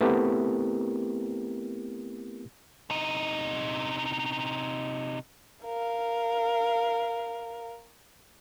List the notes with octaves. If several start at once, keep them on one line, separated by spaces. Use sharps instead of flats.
A3 B3 C4 E4 G4 A#4
C3 D#4
A#4 F5